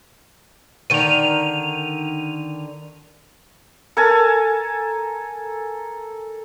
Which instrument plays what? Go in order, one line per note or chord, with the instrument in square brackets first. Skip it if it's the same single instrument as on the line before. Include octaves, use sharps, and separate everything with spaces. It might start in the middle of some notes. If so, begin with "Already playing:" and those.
[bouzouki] D3 D#3 [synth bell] D#7 F7
[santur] A4 A#4 G#5 A5